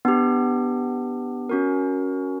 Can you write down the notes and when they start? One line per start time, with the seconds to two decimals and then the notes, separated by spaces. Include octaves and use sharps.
0.05 B3 D4 G4
1.49 C#4 F#4 A#4